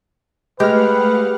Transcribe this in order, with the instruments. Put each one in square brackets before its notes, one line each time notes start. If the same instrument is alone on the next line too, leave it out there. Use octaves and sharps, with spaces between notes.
[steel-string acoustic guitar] G#3 [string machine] A3 F5 F#5 [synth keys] G4 F6 [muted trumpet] B4